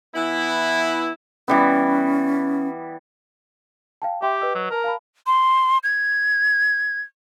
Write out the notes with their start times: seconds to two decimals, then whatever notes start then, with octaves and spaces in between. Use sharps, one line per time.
0.14 E3 B3 E4
1.48 E3 G3 B3 C#4
4.02 F5 G5 A5
4.22 G4 E5 G5 C6
4.41 B4 D#5 E6
4.55 F#3
4.71 A#4 A5 A#5
4.84 F5 A5 B5
5.27 C6
5.84 G#6